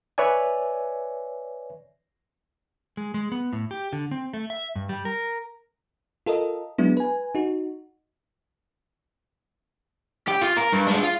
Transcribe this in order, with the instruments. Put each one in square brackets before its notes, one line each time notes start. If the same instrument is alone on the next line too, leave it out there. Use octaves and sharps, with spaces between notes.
[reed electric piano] B4 C#5 D5 E5 G#5
[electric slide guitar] G#3
G#3
B3
A2
G4
D3
C4
A3
E5
G2
G3
A#4
[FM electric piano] F4 A4 A#4 D#5
F#3 G#3 B3 D4 E4
B4 G#5
D#4 F#4
[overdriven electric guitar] G4
F4
A#4
G2
G#3 D4
F4